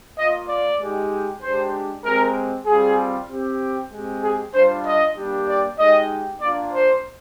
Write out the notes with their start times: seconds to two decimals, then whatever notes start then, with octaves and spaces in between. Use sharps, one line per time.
0.18 A#3 F4 D#5
0.49 D5
0.80 G#3 D#4 G4
1.43 G#3 D4 G4 C5
2.05 G#3 C4 G4 A#4
2.67 G3 C4 F4 G#4
3.30 C4 G4
3.92 G#3 C4 G4
4.23 G#4
4.54 G3 D4 F4 C5
4.85 D#5
5.16 G3 A#3 D4 G4
5.48 D5
5.79 G#3 D#4 G4 D#5
6.41 A#3 D4 F4 D5
6.73 C5